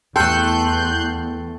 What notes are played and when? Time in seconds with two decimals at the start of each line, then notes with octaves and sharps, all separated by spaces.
0.16 E2 A3 A4 G5 C6 F#6 G6